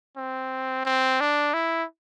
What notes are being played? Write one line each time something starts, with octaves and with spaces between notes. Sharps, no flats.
C4
C4
D4
E4